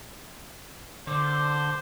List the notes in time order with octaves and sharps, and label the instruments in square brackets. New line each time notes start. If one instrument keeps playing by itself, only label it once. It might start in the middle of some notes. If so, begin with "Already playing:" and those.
[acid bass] D3 [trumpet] C5 [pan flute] D6